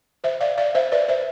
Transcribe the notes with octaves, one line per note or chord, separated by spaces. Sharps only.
C5 E5
D5 F5
D5 F5
C5 E5
B4 D5
C5 E5